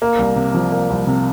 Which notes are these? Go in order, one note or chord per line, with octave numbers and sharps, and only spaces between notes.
A#3
C2
C3
F3
A#3
C2
C3